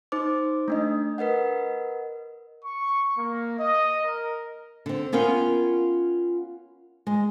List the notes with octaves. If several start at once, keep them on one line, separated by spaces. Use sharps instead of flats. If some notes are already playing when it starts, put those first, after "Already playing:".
D#4 C5 D6
A3 D4 D#5
A#4 B4 D#5 F#5
C#6
A#3
D#5
A#4
D3 C4
B3 C#4 F4 A#4 F5 G5
G#3